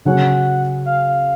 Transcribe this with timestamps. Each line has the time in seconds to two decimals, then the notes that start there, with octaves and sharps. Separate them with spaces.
0.05 C#3 F#3 C#4 F#5
0.86 F5